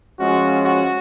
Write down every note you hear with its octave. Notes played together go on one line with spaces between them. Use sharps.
F3 G#3 C#4 F4 F#4
F#4